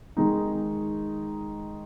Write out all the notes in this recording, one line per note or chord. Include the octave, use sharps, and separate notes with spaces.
D#3 G#3 D#4